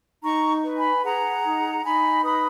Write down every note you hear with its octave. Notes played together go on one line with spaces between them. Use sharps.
D#4 A#5 C#6
B4
G#5 B5
G#4 F#5 A#5
D#4
D#4 G#5 B5
B4 B5 D#6